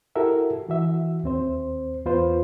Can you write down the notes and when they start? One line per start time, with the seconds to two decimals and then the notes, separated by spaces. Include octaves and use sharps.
0.16 E4 F#4 G4 A4 A#4 E5
0.69 E3 F#4 E5
1.24 D#2 C4 C5
2.05 E2 B3 F4 B4 C5